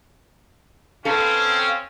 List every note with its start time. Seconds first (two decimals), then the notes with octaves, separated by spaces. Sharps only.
1.05 C4 C#4 A4 B4 F5